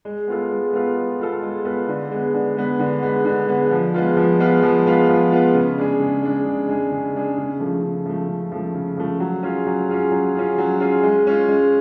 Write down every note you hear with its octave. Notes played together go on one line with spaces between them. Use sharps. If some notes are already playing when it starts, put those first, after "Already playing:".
G#3
B3 F4 A4
G#3
B3 F4 A4
G#3
B3 F4 A4
G#3
B3 F4 A4
D3
G#3 B3
D3
G#3 B3
D3
G#3 B3
D3
G#3 B3
F3
G#3 B3 F4
F3
G#3 B3 F4
F3
G#3 B3 F4
F3
G#3 B3 F4
C#3
G#3 D4 G#4
C#3
G#3 D4 G#4
C#3
G#3 D4 G#4
C#3
G#3 D4 G#4
C#3
F3 A3
C#3
F3 A3
C#3
F3 A3
C#3
F3 A3
F#3
C#4 F4 G#4
F#3
C#4 F4 G#4
F#3
C#4 F4 G#4
F#3
C#4 F4 G#4
G#3
C#4 F4
G#3